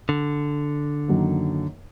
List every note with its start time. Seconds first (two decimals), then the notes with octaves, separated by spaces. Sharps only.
0.09 D3
1.08 F#2 D#3 F#3 A#3